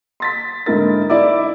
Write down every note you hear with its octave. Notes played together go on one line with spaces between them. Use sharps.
C6 A6 B6
G#2 D3 E4 A#4 A6
D#4 E4 D5 E5 D6